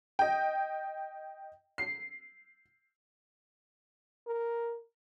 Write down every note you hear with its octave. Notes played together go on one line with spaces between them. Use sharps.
D#5 G5
C7
A#4